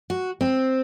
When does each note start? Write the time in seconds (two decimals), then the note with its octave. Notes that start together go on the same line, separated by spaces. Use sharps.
0.10 F#4
0.41 C4